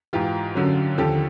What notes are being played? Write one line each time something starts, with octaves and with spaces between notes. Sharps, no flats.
G#2 E3 F4 G4
F#2 D3 F#3
D#2 D3 F3 G4 A4